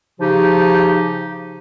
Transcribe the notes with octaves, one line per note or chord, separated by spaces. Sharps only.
C#3 F3 D#4 G4